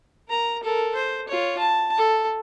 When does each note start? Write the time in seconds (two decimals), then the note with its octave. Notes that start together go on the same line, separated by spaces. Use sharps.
0.28 A#4 A#5
0.63 A4 A#4
0.95 C5
1.28 F4 C#5
1.58 A5
1.98 A4